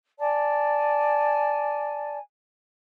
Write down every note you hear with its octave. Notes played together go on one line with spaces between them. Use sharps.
D5 G#5 A5